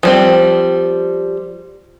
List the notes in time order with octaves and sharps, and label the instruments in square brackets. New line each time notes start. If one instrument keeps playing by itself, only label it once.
[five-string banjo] F3 G3 C4